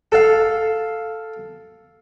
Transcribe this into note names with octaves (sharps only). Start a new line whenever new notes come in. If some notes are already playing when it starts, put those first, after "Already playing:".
A4 F5